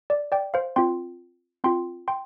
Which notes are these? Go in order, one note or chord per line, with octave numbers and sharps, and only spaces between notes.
D5
D5 G5
C5 F5
C4 F4 G5 C6
C4 F4 G5 C6
G5 C6